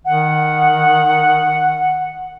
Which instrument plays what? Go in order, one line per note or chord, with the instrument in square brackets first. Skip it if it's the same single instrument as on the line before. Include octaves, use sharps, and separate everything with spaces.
[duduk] D#3 [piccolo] F#5